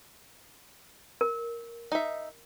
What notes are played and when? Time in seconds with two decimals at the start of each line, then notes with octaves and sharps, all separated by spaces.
1.21 A#4
1.92 D#4 E5